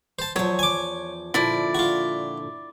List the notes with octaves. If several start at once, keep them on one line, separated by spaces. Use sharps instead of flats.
C5 A5
E2 F3 F#3 C#5
G#5 D6
A#2 D3 F3 E4 D5
F4 F#4